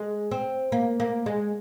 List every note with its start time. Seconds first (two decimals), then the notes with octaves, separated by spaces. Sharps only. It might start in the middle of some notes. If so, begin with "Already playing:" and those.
Already playing: G#3
0.31 C4
0.72 A#3
1.00 A#3
1.26 G#3